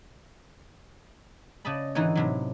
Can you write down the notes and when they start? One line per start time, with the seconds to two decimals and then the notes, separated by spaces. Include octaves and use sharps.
1.65 C#3 D5 D#5 A5 B5
1.95 G#2 D3 E3 D#4 F#4 C#5
2.15 A2 C3 F#3